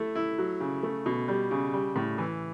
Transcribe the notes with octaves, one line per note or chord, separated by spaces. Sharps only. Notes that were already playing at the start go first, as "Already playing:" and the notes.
Already playing: A3 E4
E4
F#3
C#3
A3
B2
G3
C#3
G3
A2
E3